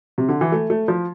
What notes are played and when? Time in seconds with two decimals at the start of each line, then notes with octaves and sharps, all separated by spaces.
0.18 C3
0.29 D3
0.41 E3
0.52 A3
0.70 A3
0.88 F3